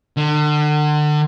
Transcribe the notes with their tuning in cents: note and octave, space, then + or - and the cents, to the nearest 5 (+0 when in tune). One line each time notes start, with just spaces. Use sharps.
D3 +35